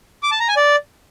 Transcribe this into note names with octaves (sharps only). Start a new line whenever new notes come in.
D6
A5
A#5
G#5
D5